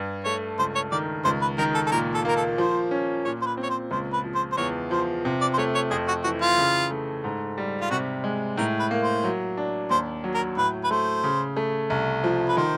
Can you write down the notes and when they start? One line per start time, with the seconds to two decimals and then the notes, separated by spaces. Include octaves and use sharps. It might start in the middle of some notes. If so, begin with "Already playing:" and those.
Already playing: G2
0.24 A3 C#5
0.59 C#2 C5
0.75 C#5
0.91 D#3 D5
1.24 C#2 C5
1.42 B4
1.58 D#3 A#4
1.75 A4
1.86 A4
1.92 A#2 A#4
2.14 A4
2.25 A#3 A#4
2.36 A4
2.58 F3 C5
2.91 C#4
3.25 A#2 C#5
3.42 C5
3.46 B4
3.57 C4
3.63 C#5
3.70 C5
3.91 C#2 C5
4.13 B4
4.24 F3
4.35 C5
4.52 C5
4.57 E2 C#5
4.91 F3 C5
5.25 C3
5.41 D5
5.54 C5
5.58 A3 C#5
5.75 C#5
5.91 F2 G#4
6.08 F#4
6.24 E3 F#4
6.41 F4
6.58 C#3
6.91 A3
7.24 G#2
7.58 G3
7.81 F4
7.90 C3 F#4
8.24 G#3
8.58 A2 A#4
8.79 B4
8.91 A#3
9.02 C5
9.24 F#3
9.57 D4
9.90 D#2 C5
10.24 F#3
10.34 A#4
10.57 A2 B4
10.84 B4
10.91 A3 C5
11.24 C#3
11.57 A3
11.90 C2
12.24 F3
12.48 B4
12.57 D#3 C5